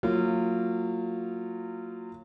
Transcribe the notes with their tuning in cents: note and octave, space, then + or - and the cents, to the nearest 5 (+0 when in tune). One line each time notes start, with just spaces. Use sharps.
F#3 -20 A#3 -30 F4 -25